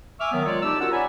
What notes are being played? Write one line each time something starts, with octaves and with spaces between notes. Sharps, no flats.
E5 G#5 C#6 D6 E6 F6
D#3 F#3 B3
D#3 F#3 G#3 F4 C#5 D5
D#4 G4 D5 A5 E6
C#4 F4 F#4 A#4 F#5 E6
C#5 D5 F#5 G#5 A#5 B5